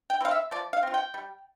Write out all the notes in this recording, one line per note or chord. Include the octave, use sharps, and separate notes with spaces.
G5
C4 E4 F5
E5
F3 D5
F5
C4 F4
G5
G3